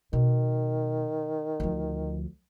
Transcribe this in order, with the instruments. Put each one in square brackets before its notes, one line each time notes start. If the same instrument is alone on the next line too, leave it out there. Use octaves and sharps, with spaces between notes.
[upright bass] B2 [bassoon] D#3
[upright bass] D2 F3